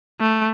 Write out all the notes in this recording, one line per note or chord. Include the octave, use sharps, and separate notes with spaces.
A3